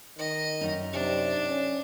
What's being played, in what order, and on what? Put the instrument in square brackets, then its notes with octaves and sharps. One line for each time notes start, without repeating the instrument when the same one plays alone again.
[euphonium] D#3 [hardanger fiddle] D#5
[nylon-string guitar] F#2 D#4
[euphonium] C3 [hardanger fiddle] D4
[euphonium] C#4